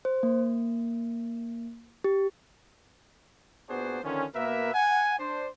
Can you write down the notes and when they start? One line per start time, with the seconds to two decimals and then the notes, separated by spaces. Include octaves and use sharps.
0.05 C5
0.23 A#3
2.04 G4
3.70 A#2 B3 D4 F#4 G#4 C5
4.04 D3 D#3 F3 C#4
4.35 B2 A#3 A#4 B4 E5
4.74 F#5 G#5
5.19 D4 C5